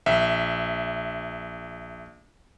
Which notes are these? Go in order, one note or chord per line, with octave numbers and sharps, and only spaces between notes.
A#1 E5